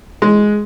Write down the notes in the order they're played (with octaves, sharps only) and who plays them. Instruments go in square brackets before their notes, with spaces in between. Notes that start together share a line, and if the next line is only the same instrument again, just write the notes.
[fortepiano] G#3